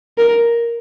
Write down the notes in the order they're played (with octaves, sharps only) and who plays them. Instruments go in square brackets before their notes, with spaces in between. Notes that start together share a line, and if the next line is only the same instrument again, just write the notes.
[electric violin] A#4